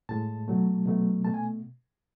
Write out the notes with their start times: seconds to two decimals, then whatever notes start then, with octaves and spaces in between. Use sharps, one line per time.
0.09 A2 G#3 A5
0.48 B2 F#3 A3
0.86 B2 F#3 A3
1.24 B2 A3 A5
1.34 G#5